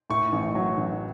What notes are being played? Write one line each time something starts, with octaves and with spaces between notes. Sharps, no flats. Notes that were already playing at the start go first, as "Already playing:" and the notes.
A2 C#6
A1
F#3
A1